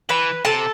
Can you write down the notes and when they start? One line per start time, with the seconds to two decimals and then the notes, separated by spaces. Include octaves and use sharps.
0.09 E3 B4 B5
0.45 C3 A4 A5